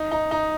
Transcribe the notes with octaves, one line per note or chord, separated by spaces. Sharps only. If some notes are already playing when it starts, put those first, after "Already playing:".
Already playing: D#4
D#4
D#4